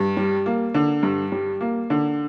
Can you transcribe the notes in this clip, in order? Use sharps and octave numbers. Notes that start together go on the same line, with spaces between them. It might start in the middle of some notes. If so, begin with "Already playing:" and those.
Already playing: G2
G3
A#3
D3
G2
G3
A#3
D3